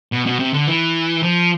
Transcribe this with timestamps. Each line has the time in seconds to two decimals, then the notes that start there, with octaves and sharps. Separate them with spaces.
0.12 B2
0.26 B2
0.40 C3
0.53 D3
0.68 E3
1.23 F3